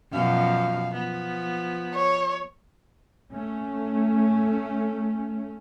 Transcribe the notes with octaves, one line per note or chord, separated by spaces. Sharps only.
F#2 B2 F3 F5
F3 B3
C#5
A3 C#4